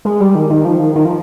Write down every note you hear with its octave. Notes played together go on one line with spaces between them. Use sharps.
G#3
G3
D#3
D#3
F3
D#3
D#3
F3